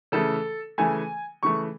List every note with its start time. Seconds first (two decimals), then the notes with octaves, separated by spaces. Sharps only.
0.12 C#3 E3 A3 A4
0.78 C#3 E3 A3 G#5
1.43 C#3 E3 A3 C#6